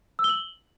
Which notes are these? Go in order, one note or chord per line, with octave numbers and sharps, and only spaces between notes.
E6
G7
F#7